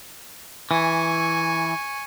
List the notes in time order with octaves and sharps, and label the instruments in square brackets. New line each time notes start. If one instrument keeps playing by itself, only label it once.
[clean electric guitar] E3 [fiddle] G#5 C#6